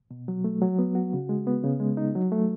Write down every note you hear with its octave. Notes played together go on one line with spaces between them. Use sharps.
B2
F#3
A3
F#3
B3
F#4
C#3
G#3
B3
C#3
G#3
D#4
F#3
A3